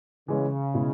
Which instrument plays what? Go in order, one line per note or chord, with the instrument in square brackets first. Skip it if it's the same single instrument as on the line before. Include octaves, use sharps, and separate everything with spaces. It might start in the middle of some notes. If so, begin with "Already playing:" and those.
[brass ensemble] C#3 [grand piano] E3 G#3 C#4
[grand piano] B2 G#3 E4 G#4